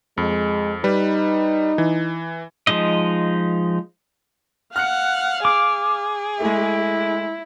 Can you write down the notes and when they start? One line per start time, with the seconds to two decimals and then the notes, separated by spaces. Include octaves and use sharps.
0.18 F2 G#3
0.84 G3 D#4 B4
1.78 E3
2.67 F3 G#3 D#4 D#5
4.76 F5 F#5 F6 F#6 C#7
5.45 G#4 D6
6.40 G#3 A3 E4